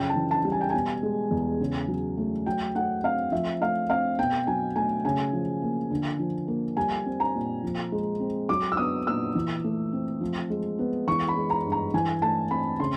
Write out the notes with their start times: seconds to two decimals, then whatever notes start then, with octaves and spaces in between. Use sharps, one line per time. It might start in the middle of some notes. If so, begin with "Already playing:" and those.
Already playing: F#2 C#3 F3 G5
0.09 A5
0.16 E3
0.31 A5
0.45 G3
0.52 G#5
0.61 G5
0.70 B2 G#5
1.03 G#3
1.31 E2
1.60 C#3
1.88 F#3
2.17 A3
2.46 F#3 G5
2.75 A3 F#5
3.03 C4 F5
3.32 F3 E5
3.61 A3 F5
3.90 C4 F5
4.19 B2 G5
4.47 F#3 G#5
4.76 A3 G#5
5.05 C#3 G#5
5.33 F3
5.62 A#3
5.90 D3
6.19 F3
6.48 A#3
6.77 G3 G#5
7.06 C4
7.20 A#5
7.35 A#2
7.64 F3
7.92 G#3
8.20 C4
8.49 F#3 D6
8.72 E6
8.77 B3 D#6
9.07 A#2 E6
9.35 E3
9.64 A3
9.92 C4
10.21 F3
10.50 G#3
10.79 B3
11.07 E3 C#6
11.29 B5
11.37 G#3
11.50 A#5
11.65 G2
11.72 A#5
11.94 E3 G#5
12.22 A3 A5
12.50 C4 B5
12.79 C#3 C6